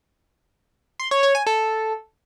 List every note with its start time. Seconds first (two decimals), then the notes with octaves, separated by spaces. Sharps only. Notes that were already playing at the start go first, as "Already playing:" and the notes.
1.00 C6
1.11 C#5
1.23 C#5
1.35 G#5
1.46 A4